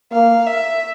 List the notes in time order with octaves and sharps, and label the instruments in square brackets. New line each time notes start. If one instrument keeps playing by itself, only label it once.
[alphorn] A#3 [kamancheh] F5
[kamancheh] E5